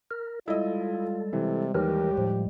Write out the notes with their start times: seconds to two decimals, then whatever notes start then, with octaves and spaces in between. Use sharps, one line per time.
0.11 A#4
0.48 G3 G#3 E4 F4 A4 D#5
1.33 C3 E3
1.75 D#2 E3 G4 A#4
2.17 A2 F3